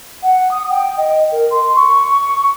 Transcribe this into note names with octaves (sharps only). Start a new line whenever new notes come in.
F#5
D#6
G5
D#5
A#4
C6
C#6